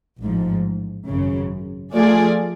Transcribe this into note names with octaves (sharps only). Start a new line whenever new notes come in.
A1 G#2 F3
G#1 F#2 C#3
F3 A3 F4 G#4 D5